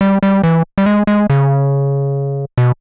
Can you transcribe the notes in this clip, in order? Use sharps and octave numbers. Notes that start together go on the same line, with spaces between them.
G3
G3
E3
G3
G#3
G#3
C#3
B2